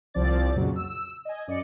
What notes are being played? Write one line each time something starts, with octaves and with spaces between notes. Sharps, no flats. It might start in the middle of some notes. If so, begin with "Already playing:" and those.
C2 F3 C4 D5 A6
F2 A#2 C#3 F#3
E6
D#5 G#5
F#2 D5 D#5 C#7